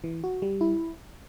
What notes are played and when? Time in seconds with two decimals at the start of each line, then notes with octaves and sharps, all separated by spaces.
0.04 E3
0.24 F#4
0.42 G3
0.61 E4